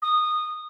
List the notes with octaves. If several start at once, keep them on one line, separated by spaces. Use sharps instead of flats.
D#6